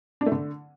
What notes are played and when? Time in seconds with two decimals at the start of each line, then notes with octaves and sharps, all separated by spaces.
0.21 D4
0.26 A3
0.32 D3